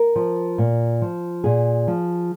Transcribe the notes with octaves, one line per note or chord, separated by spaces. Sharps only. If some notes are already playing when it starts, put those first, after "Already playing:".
Already playing: A#4
F3
A#2
F3
A#2 G#4
F3